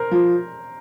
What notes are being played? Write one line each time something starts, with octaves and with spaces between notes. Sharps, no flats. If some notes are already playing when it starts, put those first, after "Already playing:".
Already playing: A#4 C5
F3